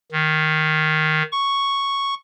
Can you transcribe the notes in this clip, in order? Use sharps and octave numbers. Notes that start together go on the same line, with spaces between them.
D#3
C#6